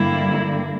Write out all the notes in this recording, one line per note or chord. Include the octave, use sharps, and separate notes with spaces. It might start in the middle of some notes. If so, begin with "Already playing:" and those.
Already playing: G2 D3 G3 A#3 E4